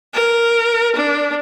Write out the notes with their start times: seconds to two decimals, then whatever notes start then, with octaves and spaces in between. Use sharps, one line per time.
0.14 A#4
0.95 D4